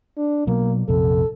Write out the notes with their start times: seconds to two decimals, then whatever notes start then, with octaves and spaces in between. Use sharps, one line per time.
0.18 D4
0.47 B2 F#3 A#3
0.88 A#1 F2 C3 A4